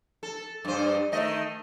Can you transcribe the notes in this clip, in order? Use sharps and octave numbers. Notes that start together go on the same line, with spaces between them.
A4
G2 C5
D#3 A3 D#5